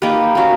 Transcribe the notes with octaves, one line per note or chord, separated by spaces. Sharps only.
A#3 D#4 G4 B4
A#3 C#4 F#4